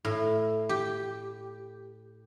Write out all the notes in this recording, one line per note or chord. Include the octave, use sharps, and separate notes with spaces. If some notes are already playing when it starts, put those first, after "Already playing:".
A2
G4